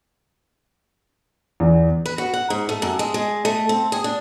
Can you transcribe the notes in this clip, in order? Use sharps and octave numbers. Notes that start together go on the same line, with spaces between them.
E2
B4
F#4
F#5
G#2
A3
F#2
G#3
G#3
A3
C4
G#4
D4